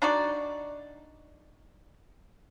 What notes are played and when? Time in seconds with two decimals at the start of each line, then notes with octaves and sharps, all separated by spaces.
0.02 D4 D#4 F#4 D5